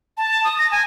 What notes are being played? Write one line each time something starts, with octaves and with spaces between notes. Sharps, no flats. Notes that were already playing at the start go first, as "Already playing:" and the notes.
A5
D#6
A#6
G#5